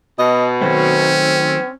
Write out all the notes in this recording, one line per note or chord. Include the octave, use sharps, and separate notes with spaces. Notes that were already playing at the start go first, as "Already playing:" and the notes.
B2 D#5
D#3 F#3 A3 C4 C#4